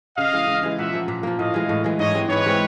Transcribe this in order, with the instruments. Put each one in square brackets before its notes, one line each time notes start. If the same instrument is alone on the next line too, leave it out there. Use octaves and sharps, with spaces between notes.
[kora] C#3 [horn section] D#5 F5
[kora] E3 G#3
C#3
E3 G#3
[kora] A#2 [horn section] E5 F#5
[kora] F3 A#3
A#2
F3 A#3
[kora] A2 [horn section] D#5 F5
[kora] E3 G#3
A2
E3 G#3
[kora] G#2 [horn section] C#5 D#5
[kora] E3 G#3 C4
[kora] G#2 [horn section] B4 C#5
[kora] E3 G#3 C4